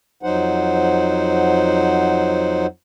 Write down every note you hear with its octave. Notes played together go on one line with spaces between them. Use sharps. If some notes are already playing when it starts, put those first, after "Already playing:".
F2 F#3 D#4 C5 F#5